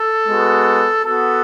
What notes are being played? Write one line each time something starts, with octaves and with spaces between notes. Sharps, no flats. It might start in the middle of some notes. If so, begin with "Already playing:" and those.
Already playing: A4
G#3 B3 F#4
B3 F#4 A4